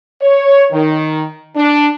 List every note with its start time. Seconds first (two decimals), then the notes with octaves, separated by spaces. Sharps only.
0.22 C#5
0.72 D#3
1.57 D4